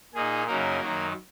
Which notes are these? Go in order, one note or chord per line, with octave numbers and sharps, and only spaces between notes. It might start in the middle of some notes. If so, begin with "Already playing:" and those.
A#2 A#3 D#4 G#4
F#2 C#3 F#3 A#3 D#4 A#4
F#2 D#3 F#3